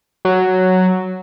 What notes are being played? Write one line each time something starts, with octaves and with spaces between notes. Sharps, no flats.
F#3